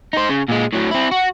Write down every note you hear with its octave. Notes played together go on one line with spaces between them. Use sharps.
D#4 C5
C#3
A#2 G#3
A2 F#3
C4 E4
F#4